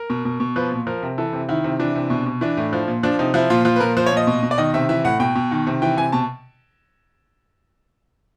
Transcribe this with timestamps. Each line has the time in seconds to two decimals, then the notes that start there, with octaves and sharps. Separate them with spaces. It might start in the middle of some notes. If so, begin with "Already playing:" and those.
Already playing: A#4
0.10 B2
0.25 B2
0.40 B2
0.56 F3 B4
0.72 A#2
0.87 F3 A#4
1.03 C3
1.18 E3 A4
1.33 C3
1.49 D#3 E4
1.64 C3
1.79 E3 D4
1.96 C3
2.10 B2
2.26 B2
2.41 E3 D4
2.57 A2
2.73 F3
2.88 A#2
3.03 F3 D4
3.19 C3 D#4
3.34 F3 E4
3.50 A#2 F4
3.65 F3 F4
3.76 B4
3.80 A#2 A#4
3.97 F3 C5
4.06 C#5
4.12 A#2 D#5
4.27 B2
4.43 B2
4.51 D5
4.58 D#3 D#5
4.74 C3 E5
4.89 E3 E5
5.04 A2 F#5
5.20 B2 G5
5.36 B2
5.51 D#3
5.67 C3
5.82 E3 G5
5.97 C3 G#5
6.12 B2 A5